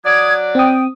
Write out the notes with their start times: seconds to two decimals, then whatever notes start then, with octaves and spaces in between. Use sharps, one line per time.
0.04 F#3 D5 D#6 G#6
0.55 C4 G5 D#6